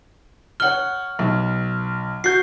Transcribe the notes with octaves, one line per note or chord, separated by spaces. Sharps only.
C#5 F#5 F6 G7
B1
F#4 G6 C7